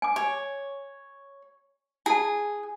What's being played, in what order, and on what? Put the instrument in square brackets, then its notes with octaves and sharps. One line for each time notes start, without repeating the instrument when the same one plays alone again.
[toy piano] G#5 D6
[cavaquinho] C#5 [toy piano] G#5
[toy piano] E4 A5 [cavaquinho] G#4